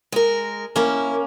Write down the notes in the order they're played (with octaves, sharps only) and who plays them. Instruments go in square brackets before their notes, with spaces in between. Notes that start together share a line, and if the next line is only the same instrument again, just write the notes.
[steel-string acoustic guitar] G#3 A#4
[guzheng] A#3 C#4 [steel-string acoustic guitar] E4